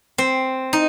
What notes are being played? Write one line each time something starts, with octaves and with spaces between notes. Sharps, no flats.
C4
D#4